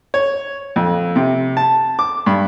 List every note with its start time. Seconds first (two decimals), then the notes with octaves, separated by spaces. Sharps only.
0.14 C#5
0.76 F2
1.16 C3
1.57 A5
1.99 D6
2.26 G2